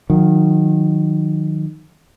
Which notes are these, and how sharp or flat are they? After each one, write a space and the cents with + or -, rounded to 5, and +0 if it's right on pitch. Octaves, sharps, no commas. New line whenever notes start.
D#3 -10 F#3 -35